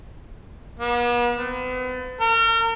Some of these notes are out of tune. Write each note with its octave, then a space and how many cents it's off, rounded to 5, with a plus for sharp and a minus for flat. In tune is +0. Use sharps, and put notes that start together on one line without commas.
B3 -45
B3 +40
A#4 -35